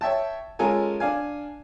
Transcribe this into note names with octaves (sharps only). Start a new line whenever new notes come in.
C#5 E5 G5 A5
G#3 C#4 F4 A4 A#4 G#5
D4 F5 G#5